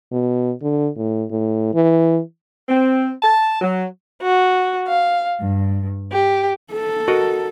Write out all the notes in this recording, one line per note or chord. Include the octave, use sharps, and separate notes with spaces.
B2
D3
A2
A2
E3
C4
A5
F#3
F#4
F5
G2
G4
A4
F#4 A#4 D#5